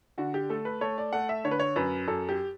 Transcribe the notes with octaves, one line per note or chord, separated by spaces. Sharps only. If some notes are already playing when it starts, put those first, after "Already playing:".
D3 F#4
G4
A3 A4
B4
A3 C#5
D5
A3 F#5
E5
D3 C#5
B4
C#5
F#2 B4
F#2 A4
G4